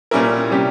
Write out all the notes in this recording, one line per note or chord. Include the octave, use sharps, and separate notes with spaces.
A#2 G3 C#4 E4 A#4
C3 G3 C#4 G4